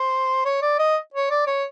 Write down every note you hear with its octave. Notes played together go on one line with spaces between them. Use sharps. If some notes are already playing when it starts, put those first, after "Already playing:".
Already playing: C5
C#5
D5
D#5
C#5
D5
C#5